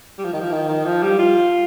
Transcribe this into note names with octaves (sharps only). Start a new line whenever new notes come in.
G3
F3
D#3
F3
D#3
D#3
F3
G3
F4